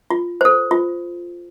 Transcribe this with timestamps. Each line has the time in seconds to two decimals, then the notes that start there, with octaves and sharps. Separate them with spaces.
0.10 F4
0.41 A4 C5
0.71 F4